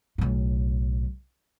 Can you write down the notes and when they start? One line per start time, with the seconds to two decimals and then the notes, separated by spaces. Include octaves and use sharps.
0.18 B1 A2